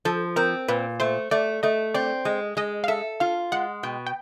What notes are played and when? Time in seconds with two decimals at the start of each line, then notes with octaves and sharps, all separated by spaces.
0.05 F3 A4
0.36 C4 A#4
0.68 A#2 B4
1.00 A3 C5
1.31 A3 D5
1.63 A3 D#5
1.95 C4 D5
2.25 G#3 D#5
2.57 G#3 D#5
2.84 F5
2.88 A4 E5
3.20 F4 F5
3.52 G#3 F#5
3.83 B2 G5
4.07 G5